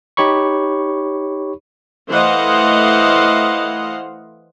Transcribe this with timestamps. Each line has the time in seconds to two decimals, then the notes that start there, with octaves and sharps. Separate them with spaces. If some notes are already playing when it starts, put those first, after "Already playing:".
0.17 D#4 G4 C#5 B5 C#6
2.11 E3 A3 C5 D#5 F5 F#5